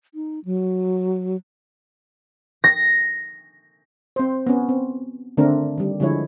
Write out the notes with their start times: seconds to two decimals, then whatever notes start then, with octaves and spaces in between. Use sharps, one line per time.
0.14 D#4
0.45 F#3
2.64 A#6
4.16 C4 C5
4.47 B3 C#4
4.69 C4
5.37 D3 D#3 A3 C4 D4 A#4
5.78 D#3 G3
6.00 D3 F3 G#3 E4 C#5